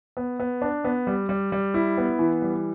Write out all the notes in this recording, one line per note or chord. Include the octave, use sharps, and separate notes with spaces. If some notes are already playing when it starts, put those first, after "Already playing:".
B3
B3
D4
B3
G3
G3
G3
E4
B3
E3
G3